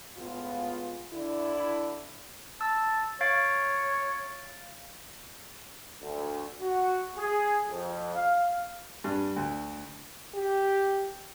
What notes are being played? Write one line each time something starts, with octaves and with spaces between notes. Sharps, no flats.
A2 G#3 B3 F4
D3 D4 E4
A5 E6
C#5 F5 A6 D7
D2
F#4
G#4
F2
F5
G2
D2
G4